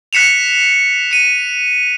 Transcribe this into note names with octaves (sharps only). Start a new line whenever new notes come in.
F#6 B6 C#7 E7 F7
C#7 D#7